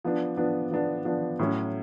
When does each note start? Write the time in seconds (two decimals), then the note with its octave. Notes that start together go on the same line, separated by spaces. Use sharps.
0.04 F3 B3 D4
0.37 F3 B3 D4
0.71 F3 B3 D4
1.05 F3 B3 D4
1.39 A2 F#3 C#4